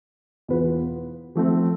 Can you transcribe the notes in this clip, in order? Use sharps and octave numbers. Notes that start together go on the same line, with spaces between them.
E2 B2 B3 F4 B4
F3 A3 C4